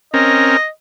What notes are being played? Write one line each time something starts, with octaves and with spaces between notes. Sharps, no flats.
C4 C#4 A#4 D#5